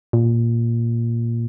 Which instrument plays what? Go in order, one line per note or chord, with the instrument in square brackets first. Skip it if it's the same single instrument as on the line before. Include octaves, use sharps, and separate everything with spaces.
[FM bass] A#2